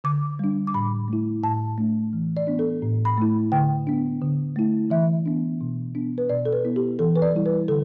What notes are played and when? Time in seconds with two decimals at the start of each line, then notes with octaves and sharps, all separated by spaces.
0.04 D3 D6
0.39 G3 D4
0.67 D6
0.74 A2 B5
1.08 A3 E4
1.43 A2 A5
1.78 A3 D4
2.13 E3
2.37 D5
2.47 B3 D4
2.59 A4
2.82 A2
3.05 B5
3.18 A3 E4
3.52 D3 G5
3.87 B3 D4
4.21 D3
4.56 A3 E4
4.90 E3 E5
5.26 B3 D4
5.61 B2
5.95 B3 D4
6.18 B4
6.29 B2 D5
6.45 A4
6.53 B4
6.65 B3 E4
6.76 G4
6.99 E3 A4
7.16 B4
7.22 D5
7.34 G3 E4
7.46 B4
7.68 D3 A4